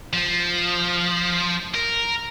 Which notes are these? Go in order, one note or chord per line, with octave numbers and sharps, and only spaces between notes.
F3
A#4